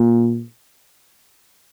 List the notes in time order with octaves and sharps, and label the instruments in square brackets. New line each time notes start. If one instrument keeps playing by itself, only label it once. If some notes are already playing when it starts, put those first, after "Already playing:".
Already playing: [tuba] A#2